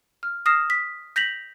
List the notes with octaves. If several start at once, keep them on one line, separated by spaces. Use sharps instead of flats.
F6
D#6 F6 A#6 C7 E7
B6
G6 A#6 B6 F7 F#7